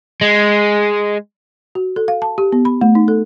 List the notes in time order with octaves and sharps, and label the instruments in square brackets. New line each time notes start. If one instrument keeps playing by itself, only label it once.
[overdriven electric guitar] G#3
[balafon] F#4
A4
F5
A5
G4
B3
B5
A3
D#4
A4